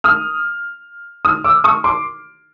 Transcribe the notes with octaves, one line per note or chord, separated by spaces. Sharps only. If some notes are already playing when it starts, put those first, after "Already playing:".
D#6 F6
D#6 F6
D6 E6
C#6 D#6
C6 D6